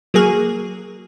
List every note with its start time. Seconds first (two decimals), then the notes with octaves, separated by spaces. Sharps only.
0.14 F#3 A#3 G#4